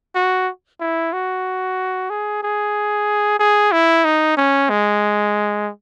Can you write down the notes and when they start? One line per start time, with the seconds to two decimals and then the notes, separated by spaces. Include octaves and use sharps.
0.15 F#4
0.80 E4
1.13 F#4
2.10 G#4
2.43 G#4
3.39 G#4
3.72 E4
4.05 D#4
4.37 C#4
4.70 G#3